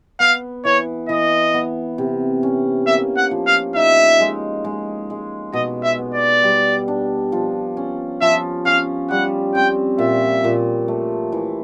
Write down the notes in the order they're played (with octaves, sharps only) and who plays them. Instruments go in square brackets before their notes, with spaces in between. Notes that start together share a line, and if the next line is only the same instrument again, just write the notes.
[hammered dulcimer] B3 [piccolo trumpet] F5
[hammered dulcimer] E3 [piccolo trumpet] C#5
[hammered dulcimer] E3 [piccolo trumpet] D#5
[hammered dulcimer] B3
C3
C#4
[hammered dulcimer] A#3 [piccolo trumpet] E5
[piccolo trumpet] F#5
[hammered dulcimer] F3
[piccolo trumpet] F5
[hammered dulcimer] D#4 [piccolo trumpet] E5
[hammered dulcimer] G#3
G#3
G#3
[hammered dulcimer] B2 [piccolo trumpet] D#5
[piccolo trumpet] E5
[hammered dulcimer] B3
[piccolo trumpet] D5
[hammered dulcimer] G3
D4
F3
C#4
[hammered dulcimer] F3 [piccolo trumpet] E5
[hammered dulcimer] C#4 [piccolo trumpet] F5
[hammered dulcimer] G3 [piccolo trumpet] F#5
[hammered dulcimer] C4 [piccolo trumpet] G5
[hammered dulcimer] A#2 [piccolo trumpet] E5
[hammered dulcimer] A#2
A3
E3